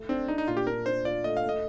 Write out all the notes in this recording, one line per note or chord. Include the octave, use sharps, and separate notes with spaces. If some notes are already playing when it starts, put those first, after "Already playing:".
Already playing: A3
C4 D4
D4 D#4
D#4
A#2 F4
G4
D4 A#4
D4 C5
F4 D5
A3 D#5
F5
A3
D#5